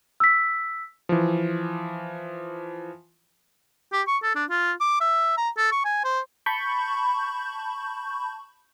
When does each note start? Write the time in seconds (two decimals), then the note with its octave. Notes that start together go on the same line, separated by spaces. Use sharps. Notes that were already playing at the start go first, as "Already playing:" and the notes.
0.20 E6 B6
1.09 E3 F3
3.92 G4
4.07 C#6
4.23 A4
4.35 D4
4.50 F4
4.80 D6
5.01 E5
5.37 A#5
5.57 A4
5.72 C#6
5.85 G#5
6.04 C5
6.46 A5 B5 C#6 G6